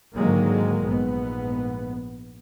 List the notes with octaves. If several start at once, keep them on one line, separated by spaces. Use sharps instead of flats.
G#2 D3 D#3 F#3 G#3 A#3
A#1 G#2 B3